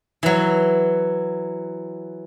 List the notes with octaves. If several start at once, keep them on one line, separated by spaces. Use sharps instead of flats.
E3 F#3